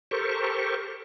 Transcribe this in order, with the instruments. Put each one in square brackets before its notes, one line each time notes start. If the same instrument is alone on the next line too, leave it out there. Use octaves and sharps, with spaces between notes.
[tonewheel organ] G4 A4 A#4 C5 C#6